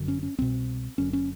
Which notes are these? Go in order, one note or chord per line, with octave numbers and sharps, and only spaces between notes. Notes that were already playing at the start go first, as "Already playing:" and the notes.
Already playing: G1 F#2 D3
C#4
C#4
C2 B2 C4
F#1 F#2 D3 C#4
C#4